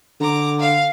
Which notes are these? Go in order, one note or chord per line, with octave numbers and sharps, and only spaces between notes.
D3 A#5 D6
F5